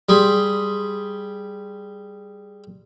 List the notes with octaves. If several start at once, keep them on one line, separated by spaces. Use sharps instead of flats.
G3 G#4 B5 C6